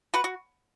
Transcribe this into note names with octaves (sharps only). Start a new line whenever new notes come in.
F#4 B4
F#4